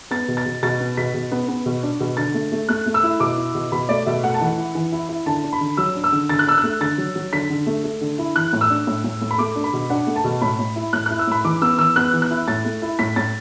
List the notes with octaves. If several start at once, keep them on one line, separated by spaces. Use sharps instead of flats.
B3 A6
B2
A6
B2
B2 A6
B3
B2 B6
B2
B3
B3
B2
D4
B2
D3 A6
A3
A3
A3 F#6
A3
E6
E4
B2 D6
E4
B2
B2 B5
A3 D5
B2 E5
A3 F#5
A5
E3 F#5
E4
E3
E4
E4
D3 A5
D4
B5
D3
F#3 E6
D4
E6
D3
D3 A6
F#6
D4 E6
F#6
A3
D3 A6
F#3
F#3
D3 B6
D3
A3
A3
D3
E4
E3 F#6
A2
E6
D4
A2
A2
A2
B5
A3 D6
D4
B5
B2
D4 F#5
A3
A5
B2
A2 B5
A2
E4
A2 F#6
E4 F#6
E6
A2 B5
E3 D6
B3 E6
E3 E6
B3 F#6
E3
F#6
E4
A2 A6
A3
E4
A2 B6
A2 A6